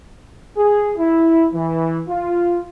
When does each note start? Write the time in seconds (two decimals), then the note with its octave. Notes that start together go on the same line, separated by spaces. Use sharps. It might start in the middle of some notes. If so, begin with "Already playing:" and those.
0.57 G#4
0.98 E4
1.53 E3
2.09 F4